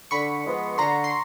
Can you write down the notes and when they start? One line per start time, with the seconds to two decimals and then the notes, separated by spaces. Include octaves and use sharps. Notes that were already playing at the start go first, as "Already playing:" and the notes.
0.11 D3 B5 C#6
0.45 F3 G#3 B3
0.78 D3 A#5 C6
1.04 C6